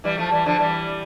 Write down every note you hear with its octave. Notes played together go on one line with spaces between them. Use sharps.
E3 G3
F3 A3
E3 G3
D3 F3
E3 G3